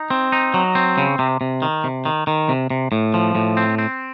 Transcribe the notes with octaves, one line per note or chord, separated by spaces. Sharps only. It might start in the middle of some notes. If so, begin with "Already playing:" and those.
Already playing: D#4
C4
D#4
F#3
C4
C#3
C3
C3
D#3
C3
D#3
D#3
C3
C3
A2
F3
A2
C4
C4